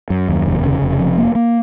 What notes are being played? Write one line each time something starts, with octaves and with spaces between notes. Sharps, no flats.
F#2
D#2
F1
C#3
F1
F2
A#3
A#3